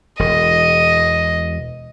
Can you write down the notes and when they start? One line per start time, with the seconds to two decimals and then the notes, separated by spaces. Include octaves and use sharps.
0.19 E1 D#5